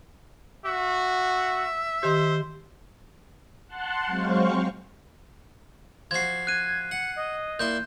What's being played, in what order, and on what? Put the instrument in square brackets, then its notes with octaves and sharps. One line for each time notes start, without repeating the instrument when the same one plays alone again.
[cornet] F#4 [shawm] E5
[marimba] D#3 G4 [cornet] C5
[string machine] F#5 A5 C6 F#6
F#3 G#3 C4 C5 F5 C#6
[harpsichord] F3 F#4 [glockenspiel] G#6 C7
[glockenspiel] F#6 D#7 [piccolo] G#6
[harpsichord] F#5 [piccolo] C#7
[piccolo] D#5
[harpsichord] A#2 E4 C6 [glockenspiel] G6